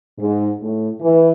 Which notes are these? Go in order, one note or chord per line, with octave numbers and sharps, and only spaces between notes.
G#2
A2
E3